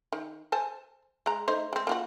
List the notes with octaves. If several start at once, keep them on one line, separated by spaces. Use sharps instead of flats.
D#3
C5 G#5 A5
G#3 A#5
A3 D#4 C5
G#3 C4
A#3 F4 F#4